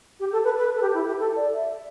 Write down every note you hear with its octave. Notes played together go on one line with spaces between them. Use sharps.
G4
A4
B4
B4
A4
G4
E4
G4
A4
D5
E5